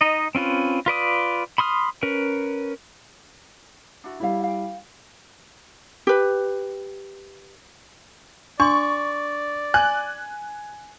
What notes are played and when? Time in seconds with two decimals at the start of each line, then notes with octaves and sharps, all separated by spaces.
0.01 D#4 D#5
0.35 C4 C#4 F4 B4
0.86 F4 B4 D5 D#6
1.58 B5 C6 D#6 F6
2.03 C#4 A#4 B4
4.04 D4 E4 F#4
4.20 G3 E4 A4 C#5 F5
4.44 F5 G5
6.07 G4 B4
8.60 D4 D5 C6 C#6
9.74 G#5 F#6